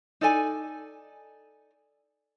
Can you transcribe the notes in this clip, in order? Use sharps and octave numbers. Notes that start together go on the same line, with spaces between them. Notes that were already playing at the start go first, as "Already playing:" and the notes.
D#4 A4 D5 G#5